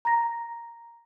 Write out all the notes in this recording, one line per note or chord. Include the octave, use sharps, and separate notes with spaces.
A#5 A#6